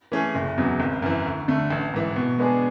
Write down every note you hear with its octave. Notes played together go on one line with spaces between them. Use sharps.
E3 A3 C#4 G#4
F#1
E2 C#3 F#3
G#1
F#2 E3
D2
D3 A3
A1
G#2 E3
B2
G#3 B3 D4 G#4